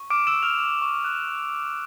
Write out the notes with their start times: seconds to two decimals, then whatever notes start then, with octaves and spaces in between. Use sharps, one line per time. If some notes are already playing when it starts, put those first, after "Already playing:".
Already playing: C#6
0.10 D6 F6 D7
0.27 E6 E7
0.34 C#6
0.42 F6 F7
0.58 F6
0.82 C#6
1.04 F#6
1.28 C#6